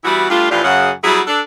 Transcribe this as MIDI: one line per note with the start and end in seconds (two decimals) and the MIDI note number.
0.04 0.30 52
0.04 0.30 55
0.04 0.30 59
0.04 0.30 64
0.04 0.30 66
0.30 0.50 55
0.30 0.50 57
0.30 0.50 62
0.30 0.50 65
0.50 0.63 45
0.50 0.63 52
0.50 0.63 53
0.50 0.63 62
0.50 0.63 65
0.50 0.63 67
0.64 0.91 42
0.64 0.91 49
0.64 0.91 78
1.04 1.21 54
1.04 1.21 55
1.04 1.21 59
1.04 1.21 64
1.04 1.21 66
1.04 1.21 68
1.27 1.41 62
1.27 1.41 69